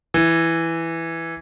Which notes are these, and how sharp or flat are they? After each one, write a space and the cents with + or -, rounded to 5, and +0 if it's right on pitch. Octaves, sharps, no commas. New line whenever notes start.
E3 +5